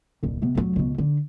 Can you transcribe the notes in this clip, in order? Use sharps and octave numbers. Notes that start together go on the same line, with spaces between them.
D#1 C2
C3 B3
F1 F#3
C#2 B2
D3